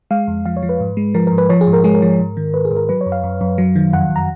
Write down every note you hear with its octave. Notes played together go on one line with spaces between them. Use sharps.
G#3 F5
F2
F3 F5
C#5
F3
B4
G#2
G#3
F3 A#4
G#2 A#4
B4
F3 C#5
G#4
G#2
A#4
G#3 G#4
A#4
F3
G#2
D#3
G#2 B4
G#4
G#2
A#4
F#3 B4
C#5
F#2
F5
F#2
F#2
F#3
D#3
F2 F#5
F2
A#5